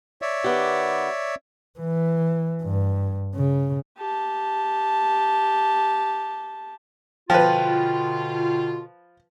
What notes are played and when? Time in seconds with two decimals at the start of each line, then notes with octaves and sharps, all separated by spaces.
0.22 C#5 D5 E5
0.44 D#3 B3 G4
1.79 E3
2.63 G2
3.35 C#3
3.98 G4 A5
7.30 B2 D3 F3 F4 B4 G5